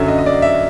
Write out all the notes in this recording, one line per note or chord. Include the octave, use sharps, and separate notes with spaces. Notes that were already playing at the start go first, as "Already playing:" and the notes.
Already playing: F#2 D3 F#3 E5
D#5
D#5
D5
E5